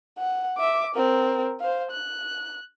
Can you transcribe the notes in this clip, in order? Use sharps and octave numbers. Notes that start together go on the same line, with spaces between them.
F#5
E5 D6
C4 A#4
C5 F5
F#6